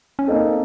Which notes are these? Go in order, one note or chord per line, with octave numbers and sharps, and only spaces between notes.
C#4
A#3 C4 D#4 A4